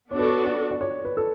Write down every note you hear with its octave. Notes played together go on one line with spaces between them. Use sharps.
B3 D4 F#4 A4 C#5
B4
C#5
D5
D5
C#5
B4
A4